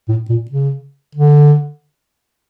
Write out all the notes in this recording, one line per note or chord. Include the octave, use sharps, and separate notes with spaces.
A2
A#2
C#3
D3